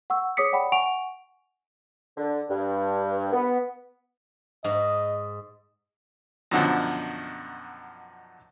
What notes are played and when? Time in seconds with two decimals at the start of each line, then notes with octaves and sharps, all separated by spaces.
0.10 F#5 C#6 E6
0.37 G#4 C#5 D6 D#6 B6 C#7
0.52 C#5 D5 F#5 G5 B5
0.72 F#5 G#5 C#6 D7 F7
2.18 D3
2.49 G2
3.33 B3
4.64 G#2 D#5
6.51 F#2 B2 D3 D#3 F3